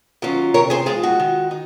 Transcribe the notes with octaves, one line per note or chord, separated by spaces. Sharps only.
D#3 F#3 C#4 F4
C3 A#4 C#5
G#4 C5
F3 G#3 D#4 F4 G#4
F#4
D#3
D#4